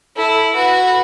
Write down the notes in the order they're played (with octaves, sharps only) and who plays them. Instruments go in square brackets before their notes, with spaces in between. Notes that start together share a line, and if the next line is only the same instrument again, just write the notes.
[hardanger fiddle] E4 [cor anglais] A4
[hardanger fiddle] F#4 [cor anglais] B4